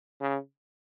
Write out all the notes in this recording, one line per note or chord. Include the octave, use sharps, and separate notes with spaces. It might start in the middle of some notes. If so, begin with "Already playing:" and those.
C#3